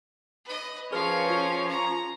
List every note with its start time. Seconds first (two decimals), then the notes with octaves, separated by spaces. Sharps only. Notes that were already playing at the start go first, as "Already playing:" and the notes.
0.45 B4 D#5
0.92 F3 C#4 G#4 A#4 B4 C#5 F5 F6
1.30 F4
1.68 A#5